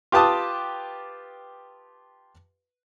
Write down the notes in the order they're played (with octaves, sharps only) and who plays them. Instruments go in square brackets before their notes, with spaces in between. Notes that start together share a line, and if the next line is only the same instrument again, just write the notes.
[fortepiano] F4 G4 B4 A5 D#6